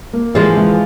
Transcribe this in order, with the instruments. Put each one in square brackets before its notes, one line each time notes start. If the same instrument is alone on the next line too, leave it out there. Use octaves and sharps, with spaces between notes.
[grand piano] A#3
[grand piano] E3 [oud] F3 G#3
[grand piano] E3